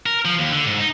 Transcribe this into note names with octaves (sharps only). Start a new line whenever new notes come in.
A#4
F3
D#2
D3
G#2
D#4